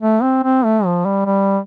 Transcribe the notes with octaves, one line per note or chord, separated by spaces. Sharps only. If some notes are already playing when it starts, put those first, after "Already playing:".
A3
C4
C4
A3
F3
G3
G3